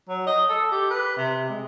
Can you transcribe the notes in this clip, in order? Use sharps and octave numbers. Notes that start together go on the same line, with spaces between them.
F#3
D#5
A4
G4
B4
C3
G#3